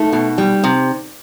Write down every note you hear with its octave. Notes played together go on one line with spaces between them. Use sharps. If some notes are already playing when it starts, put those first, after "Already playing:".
Already playing: A3 D#4
B2
G3
C3